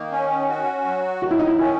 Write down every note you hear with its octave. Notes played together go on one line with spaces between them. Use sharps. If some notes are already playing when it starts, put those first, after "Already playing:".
Already playing: D#3 A#3
C#4
F#4
F#3
D#3 F#4
E4
D#4
E4
C#4 E4